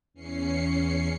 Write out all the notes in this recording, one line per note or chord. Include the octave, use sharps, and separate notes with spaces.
E2 C#4 C7 C#7